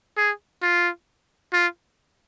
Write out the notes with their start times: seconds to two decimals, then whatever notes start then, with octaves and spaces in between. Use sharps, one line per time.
0.17 G#4
0.62 F4
1.53 F4